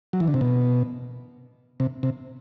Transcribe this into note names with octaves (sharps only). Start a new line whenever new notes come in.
F#3
E3
D3
C3
B2
C3
C3